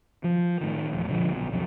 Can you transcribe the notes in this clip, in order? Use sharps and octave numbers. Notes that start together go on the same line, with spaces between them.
F3
A2 D#3
E1 A#1
A#2 D3 E3 F3
B1
B1 F2 F#3